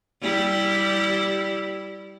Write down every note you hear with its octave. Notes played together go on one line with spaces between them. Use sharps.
G3 E4 G4